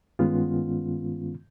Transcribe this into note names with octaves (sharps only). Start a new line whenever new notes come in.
G2 D#3 G#3 B3 C#4 F4